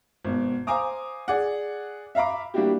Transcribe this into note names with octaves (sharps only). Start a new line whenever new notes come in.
G#1 B2
C5 F5 G#5 A#5 D6 D#6
G#4 D5 F#5
E5 F5 A#5 B5 D6
G3 A#3 D4 E4 F#4 G4